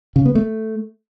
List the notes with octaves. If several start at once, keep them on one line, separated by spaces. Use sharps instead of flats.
C#3
B3
A3